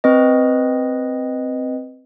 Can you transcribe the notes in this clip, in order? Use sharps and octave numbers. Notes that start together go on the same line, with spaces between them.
C4 B4 D#5